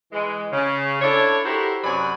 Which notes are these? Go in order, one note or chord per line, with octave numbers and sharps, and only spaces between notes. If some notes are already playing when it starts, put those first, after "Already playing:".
E3 G#3
C#3
D4 E4 A4 C#5
E4 F#4 G4 A4 A#4 C5
F#2 C3 F#3 D5 G#5 B5